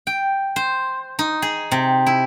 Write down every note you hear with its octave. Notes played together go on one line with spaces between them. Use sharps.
G5
C5
D#4
G#4
C3
E4